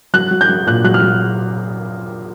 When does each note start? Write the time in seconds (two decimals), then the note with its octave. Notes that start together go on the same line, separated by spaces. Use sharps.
0.14 F#3 F#6
0.31 F#3
0.41 G6
0.49 F#3
0.67 A#2 F#6
0.84 F#3 F#6
0.94 F6
1.02 F#3